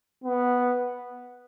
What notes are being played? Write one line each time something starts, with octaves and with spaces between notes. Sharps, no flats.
B3